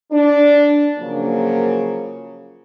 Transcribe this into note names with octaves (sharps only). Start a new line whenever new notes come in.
D4
C#3 F3 F#3 A#3